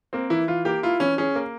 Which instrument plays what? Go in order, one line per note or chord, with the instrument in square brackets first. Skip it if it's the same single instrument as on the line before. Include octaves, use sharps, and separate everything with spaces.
[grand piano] A#3 [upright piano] C4
[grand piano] E3 [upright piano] E4
[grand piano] E3 [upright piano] F4
[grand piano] A#3 [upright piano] G4
[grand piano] E4 [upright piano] F4
[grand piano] E3 [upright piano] C#4
[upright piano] C#4 [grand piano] G#4
[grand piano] A#3